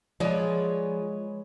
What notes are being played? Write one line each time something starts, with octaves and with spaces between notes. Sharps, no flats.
F3 G#3 G#4 B4 C#5 D5